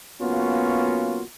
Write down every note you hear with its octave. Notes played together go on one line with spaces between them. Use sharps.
B1 A#3 B3 C#4 F4 F#4